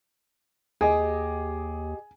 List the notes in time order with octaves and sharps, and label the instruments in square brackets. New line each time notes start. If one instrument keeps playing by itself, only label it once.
[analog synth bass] D#2 [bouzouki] G4 D#5 [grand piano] G#4 [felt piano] G#5